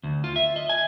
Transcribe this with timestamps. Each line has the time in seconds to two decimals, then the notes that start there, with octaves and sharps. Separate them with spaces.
0.03 D2
0.24 F4
0.36 E5
0.56 D#5
0.69 G#5